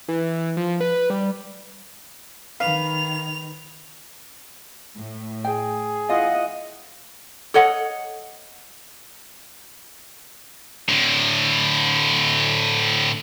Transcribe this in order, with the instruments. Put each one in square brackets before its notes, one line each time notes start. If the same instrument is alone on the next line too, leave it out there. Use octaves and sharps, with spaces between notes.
[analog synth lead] E3
F3
B4
G3
[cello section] D#3 [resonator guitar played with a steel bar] B4 [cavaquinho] F5 [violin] F7
[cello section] A2
[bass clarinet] G#4 [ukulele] G5
[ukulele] E4 F4 F5 [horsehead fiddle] D#5 F#5
[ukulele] A4 C#5 D#5 F#5
[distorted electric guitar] A2 D3